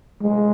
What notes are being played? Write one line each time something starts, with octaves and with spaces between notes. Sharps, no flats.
G#3